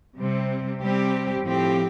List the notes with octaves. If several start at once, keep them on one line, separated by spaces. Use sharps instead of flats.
C3 G3 C4
C3 G3 C4 G4
A2 F3 C4 G4